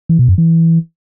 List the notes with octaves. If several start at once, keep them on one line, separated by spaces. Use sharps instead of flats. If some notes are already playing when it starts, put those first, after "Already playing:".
E3
B2
F#2
E3